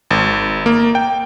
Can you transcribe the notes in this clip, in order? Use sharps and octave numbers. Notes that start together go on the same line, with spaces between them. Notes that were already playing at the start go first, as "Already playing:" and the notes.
G#1
A#3
G5